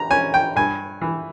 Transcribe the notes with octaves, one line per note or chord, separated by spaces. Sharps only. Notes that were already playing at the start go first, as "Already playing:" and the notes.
Already playing: A#5
C#4 G#5
G5
G2 G#5
E3